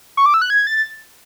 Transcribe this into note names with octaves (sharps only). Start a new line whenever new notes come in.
C#6
D6
E6
F#6
G#6
A6